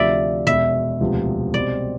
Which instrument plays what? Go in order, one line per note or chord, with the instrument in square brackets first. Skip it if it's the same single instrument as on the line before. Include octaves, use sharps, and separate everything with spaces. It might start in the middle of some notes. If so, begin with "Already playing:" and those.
Already playing: [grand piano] D2 C3 F3 [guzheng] D5 E5
[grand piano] E1 E2 B2 [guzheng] E5
[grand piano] E1 D2 C3 F3 B3
[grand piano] C2 B2 G3 C4 [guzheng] D5